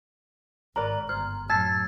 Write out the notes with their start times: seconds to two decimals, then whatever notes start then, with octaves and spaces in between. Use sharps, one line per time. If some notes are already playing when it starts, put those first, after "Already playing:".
0.76 G#1 A#4 B4 D5 A#5
1.09 G1 C5 F6
1.49 F#2 A2 A5 E6 G#6 A6